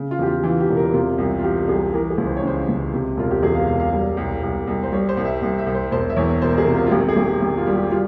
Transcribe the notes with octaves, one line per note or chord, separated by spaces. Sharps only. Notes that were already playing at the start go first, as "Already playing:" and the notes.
Already playing: C#3
F4
E2 G4
F4
E3 F4
G4
E1
A#4
C3 F4
C2
F4
E3 G4
C2 G#4
E3 A#4
G#4
C#2
C5
C#5
C#3 C5
C#2
C3
E1 F4
G4
E2 G#4
F5
E1 F5
F5
G3
C2
C2
C2
C5
G3 C#5
C5
C2
E5
C2
E5
C2
C5
E1 C5
E5
E2 C#5
E1 C5
A#4
G#4
C3
F4
F4
G#1 G4
G#4
G#1
G4
G#1
F4
G3
G4
G3 F4